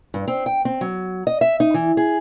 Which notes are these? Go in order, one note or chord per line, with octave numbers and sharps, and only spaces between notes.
G2
C4
G5
C4
F#3
D#5
E5
D#4
E3
G#4